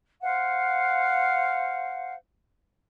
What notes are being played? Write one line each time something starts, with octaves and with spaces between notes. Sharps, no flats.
C5 F5 F#5